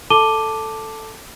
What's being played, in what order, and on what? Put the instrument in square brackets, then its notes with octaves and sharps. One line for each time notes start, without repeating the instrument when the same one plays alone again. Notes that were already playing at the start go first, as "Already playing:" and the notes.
[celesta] A4 A5 D6 D#7 G7